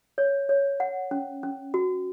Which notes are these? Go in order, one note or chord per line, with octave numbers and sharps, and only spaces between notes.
C#5
C#5
F#5
C#4
C#4
F#4